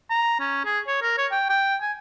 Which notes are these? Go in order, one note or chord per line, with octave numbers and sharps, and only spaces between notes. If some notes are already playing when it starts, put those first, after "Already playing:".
A#5
C#4
G#4
C#5
A#4
C#5
G5
G5
G#5